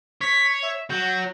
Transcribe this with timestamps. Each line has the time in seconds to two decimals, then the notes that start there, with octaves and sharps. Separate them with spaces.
0.21 C#5 B6
0.63 E5
0.90 F#3 G6